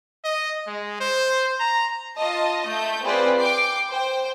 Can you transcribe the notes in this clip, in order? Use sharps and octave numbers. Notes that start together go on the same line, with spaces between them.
D#5
G#3
C5
A#5
F4 D#5 A5
A3 G6
C4 F4 G#4 B4 C5 D5
G5 D6 C7
C5 G5